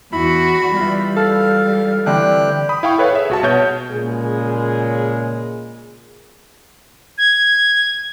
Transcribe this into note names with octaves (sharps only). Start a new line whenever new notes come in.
E2 E4 F#4 B5
E3 G3 F4
A4 F5
D3 E3 C4 G4 G5 F#6
B5 D#6
E4 F5 G5 C#6
A4 B4 C#5 F5
G#4 E5
C2 F#4 A5
B2 C#5 G6
A#2 C#3 G#3 G#4
G#6